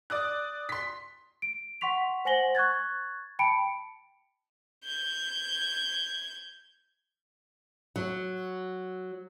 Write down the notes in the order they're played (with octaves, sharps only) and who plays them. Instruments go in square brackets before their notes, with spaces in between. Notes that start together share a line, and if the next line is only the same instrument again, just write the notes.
[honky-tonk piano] D5 D#6 F#6
C6 B6
[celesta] D7
F#5 C6 C#6 B6 F7
C5 F#5 G#5 A#6 F#7 G7
C#6 F#6 G#6 A6
G5 A5 B5 C#7 D7
[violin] G6 G#6
[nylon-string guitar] F#3